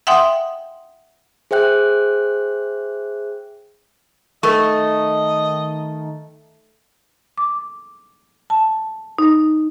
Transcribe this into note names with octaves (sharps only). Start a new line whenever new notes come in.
E5 F#5 G5 C6 D#6
G#4 C5 E5 G5 F#6
D#3 A3 A#4 D#5 C#6
D6
A5
D#4